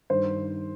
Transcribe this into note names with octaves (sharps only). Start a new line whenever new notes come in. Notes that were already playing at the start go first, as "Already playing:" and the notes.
G2 D#3 C5